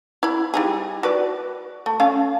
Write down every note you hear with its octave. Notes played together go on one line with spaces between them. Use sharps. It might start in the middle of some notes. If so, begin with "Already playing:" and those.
E4 B5
G3 D#4 G#4
F#4 B4 D5
A3
A3 C#4 F5